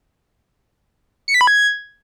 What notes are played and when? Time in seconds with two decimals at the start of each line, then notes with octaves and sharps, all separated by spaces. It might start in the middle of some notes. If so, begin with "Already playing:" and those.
1.28 C#7
1.34 B6
1.41 B5
1.47 G#6